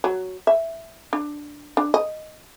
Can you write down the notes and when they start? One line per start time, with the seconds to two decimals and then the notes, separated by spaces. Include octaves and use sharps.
0.04 F#3
0.47 E5
1.13 D4
1.77 D4
1.94 D#5